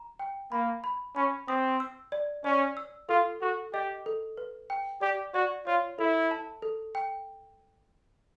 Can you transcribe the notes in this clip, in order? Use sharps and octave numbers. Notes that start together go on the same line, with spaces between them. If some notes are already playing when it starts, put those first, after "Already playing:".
Already playing: A#5
G5
A#3 B5
B5
C#4 B5
C4 D#6
E6
D5
C#4 D5
E6
F4 A4
F#4 A4
G4 D#5
A4
B4
G5
G4 D5
F#4 D5
F4 C#5
E4 A4
A5
A4
G5